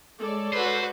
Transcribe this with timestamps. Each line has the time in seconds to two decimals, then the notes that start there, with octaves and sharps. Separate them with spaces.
0.19 G#3 A4 C#5 D5
0.54 F#4 B4 C5 G6